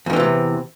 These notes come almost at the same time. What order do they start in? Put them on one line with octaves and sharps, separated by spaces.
E2 D#3 E3 A2 C3